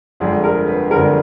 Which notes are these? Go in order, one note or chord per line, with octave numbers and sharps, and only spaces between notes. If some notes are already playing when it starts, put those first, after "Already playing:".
G1 F2 D3 F3 G#3 G#4
A#4
B4
G1 F2 D3 F3 G#3 A#4